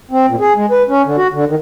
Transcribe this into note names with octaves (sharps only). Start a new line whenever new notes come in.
C4
A#2
G#4
G#3
B4
C#4
D3
F#4
D3
D#3